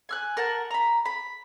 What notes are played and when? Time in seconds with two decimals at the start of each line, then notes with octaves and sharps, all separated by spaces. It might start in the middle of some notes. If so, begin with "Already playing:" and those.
0.09 G#5 F6 F#6
0.37 A#4 F#5 A5
0.71 A#5 B5
1.05 B5